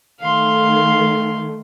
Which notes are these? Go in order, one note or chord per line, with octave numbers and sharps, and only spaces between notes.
D#3 A3 F5 C6